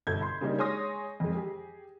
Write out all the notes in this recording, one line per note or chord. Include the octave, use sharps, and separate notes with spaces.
G1 B2 A4 G6 G#6
B5 C6
C#3 G3 A#3 D4 D#4
G#3 C#5 G#5 C6 D#6 A#6
F2 G#3
G4 G#4